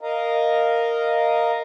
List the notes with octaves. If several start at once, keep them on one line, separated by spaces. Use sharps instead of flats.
A#4 D#5 F5 A#5